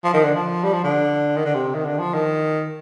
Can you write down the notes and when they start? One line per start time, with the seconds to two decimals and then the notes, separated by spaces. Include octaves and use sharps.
0.04 F3
0.14 D#3
0.24 D3
0.35 F3
0.64 G3
0.73 F3
0.84 D3
1.37 D#3
1.45 D3
1.54 C3
1.74 D#3
1.85 D3
1.99 F3
2.14 D#3